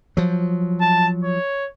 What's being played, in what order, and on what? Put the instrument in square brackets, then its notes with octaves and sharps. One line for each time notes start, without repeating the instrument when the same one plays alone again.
[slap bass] F3 F#3
[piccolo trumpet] A5
C#5